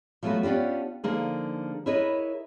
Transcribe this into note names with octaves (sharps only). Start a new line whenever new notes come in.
F3 F#3 A3 B3 F#4 B4
B3 C#4 D4 F4 G4
D3 F3 A#3 D#4 G#4
E4 G#4 A#4 B4 C#5 D#5